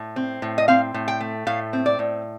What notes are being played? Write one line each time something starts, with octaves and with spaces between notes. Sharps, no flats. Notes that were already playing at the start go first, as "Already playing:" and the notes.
Already playing: A2
C4
A2
D#5
C4 F5
A2
G5
A3
A2 F5
C4
D5
A2